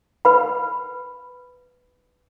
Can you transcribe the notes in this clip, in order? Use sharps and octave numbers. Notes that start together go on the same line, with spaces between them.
B4 B5